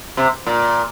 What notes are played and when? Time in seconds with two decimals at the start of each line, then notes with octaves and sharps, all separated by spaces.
0.17 C3
0.46 A#2